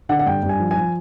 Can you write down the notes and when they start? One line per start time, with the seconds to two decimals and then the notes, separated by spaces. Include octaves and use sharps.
0.09 D3 F#5
0.19 F#5
0.26 G2 G5
0.43 G2
0.49 G#5
0.60 F3
0.71 G#5
0.77 F3